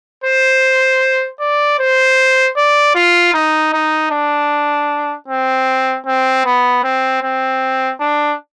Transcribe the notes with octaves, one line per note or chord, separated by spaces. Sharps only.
C5
D5
C5
D5
F4
D#4
D#4
D4
C4
C4
B3
C4
C4
D4